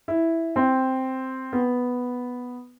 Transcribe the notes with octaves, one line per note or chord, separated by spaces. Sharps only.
E4
C4
B3